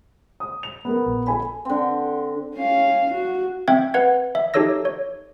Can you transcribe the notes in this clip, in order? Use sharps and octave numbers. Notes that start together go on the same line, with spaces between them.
D#6
F7
B3 A#4
A#1
A4 G#5 B5
D3 C4
C#4 F5
F#4
C4 E5 G5 G#6
B4 F#5 G#6
E5
D#4 G4 A4 C#5 E6 A#6
C#5